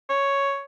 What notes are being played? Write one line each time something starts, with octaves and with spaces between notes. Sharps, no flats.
C#5